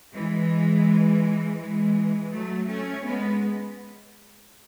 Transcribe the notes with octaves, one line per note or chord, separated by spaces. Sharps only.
E3 G#3
E3 G#3
F#3 A3
A3 C#4
G#3 B3